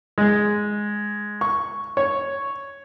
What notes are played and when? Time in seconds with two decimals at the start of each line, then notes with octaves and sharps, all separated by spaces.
0.18 G#3
1.41 C#6
1.97 C#5